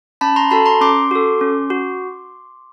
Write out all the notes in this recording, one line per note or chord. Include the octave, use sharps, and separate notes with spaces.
C#4 A5 B5
A#5 C6
F#4 A4 A5 B5
A#5 C6
C#4 C6 D6
F#4 A4
C#4
F#4